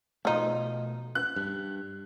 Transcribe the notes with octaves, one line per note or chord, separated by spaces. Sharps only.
B2 F3 A3 D#4
F#6
G2